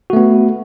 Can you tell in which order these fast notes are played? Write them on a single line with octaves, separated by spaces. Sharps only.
F#4 A3 B3